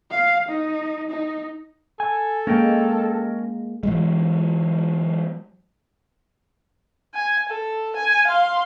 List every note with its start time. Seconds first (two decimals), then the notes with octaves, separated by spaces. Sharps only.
0.11 F5
0.48 D#4
1.11 D#4
2.00 A4 G#5
2.47 G#3 A#3 C#4 A#4 G5
3.83 E3 F#3 G#3
7.15 G#5
7.49 A4
7.96 G#5
8.27 F5 C6